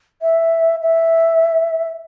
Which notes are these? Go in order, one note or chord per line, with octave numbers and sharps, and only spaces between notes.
E5
E5